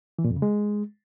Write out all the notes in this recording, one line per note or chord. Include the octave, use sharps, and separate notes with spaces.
E3
A#2
F2
C#3
G#3